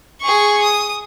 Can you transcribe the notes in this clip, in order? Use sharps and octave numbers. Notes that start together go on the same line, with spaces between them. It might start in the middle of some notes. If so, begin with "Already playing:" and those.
G#4 C#6
D#6